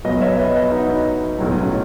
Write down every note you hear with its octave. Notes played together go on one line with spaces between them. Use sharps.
B1 B2 F#3 B4 D#5
C#5 E5
B4 D#5
B4 D#5
D#4 F#4
B1 A2 F#3
C#4